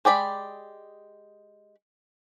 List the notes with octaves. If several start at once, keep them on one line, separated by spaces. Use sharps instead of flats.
G#3 G4 D5 B5